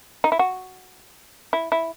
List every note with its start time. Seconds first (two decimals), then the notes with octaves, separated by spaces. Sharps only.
0.24 D#4
0.32 E4
0.39 F#4
1.53 E4
1.72 E4